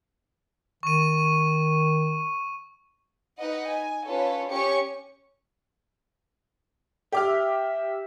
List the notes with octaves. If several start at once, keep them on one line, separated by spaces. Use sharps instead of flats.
D#3 C#6 D#7
D#4 B4 D#5 F#5
G#5
C#4 F4 A4 B4 C#5
C#4 G4 C#5 C#6 C#7
G4 E5 D6 F6